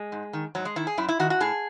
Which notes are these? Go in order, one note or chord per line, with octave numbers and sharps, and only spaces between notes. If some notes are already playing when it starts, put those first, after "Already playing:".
Already playing: G#3
G#2
D#3
G#2 F#3
G#3
D#3 E4
G#4
F#2 E4
E4
D#3 F#4
F#4
A2 G#4